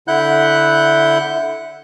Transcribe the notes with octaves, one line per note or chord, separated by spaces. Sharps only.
D3 E4 F#5 F#6 G6